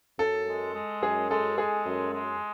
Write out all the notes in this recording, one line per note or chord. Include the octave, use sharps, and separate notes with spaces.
F#2 A4
G#3
G#3
F#2 G#4
G#3 A4
G#3 G#4
F#2
G#3